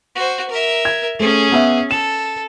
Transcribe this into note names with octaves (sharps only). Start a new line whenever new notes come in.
F#4 C5
A#4 E5
G#6
A3 C#4 G#4
B3 E5
A4 E7